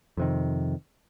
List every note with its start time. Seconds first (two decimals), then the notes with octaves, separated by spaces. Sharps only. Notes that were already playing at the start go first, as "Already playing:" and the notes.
0.17 F2 C3 D#3